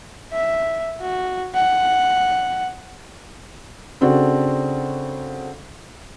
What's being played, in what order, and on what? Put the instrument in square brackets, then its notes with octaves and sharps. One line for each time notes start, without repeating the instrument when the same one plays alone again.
[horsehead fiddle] E5
F#4
F#5
[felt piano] C#3 C4 D4 F#4 A4